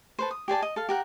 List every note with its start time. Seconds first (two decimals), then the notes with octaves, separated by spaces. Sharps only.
0.19 A4 B4 C5
0.31 D#6
0.48 G4 G#4 D5 A5
0.62 D#5
0.76 A4 F5
0.89 G4 A#4 F#5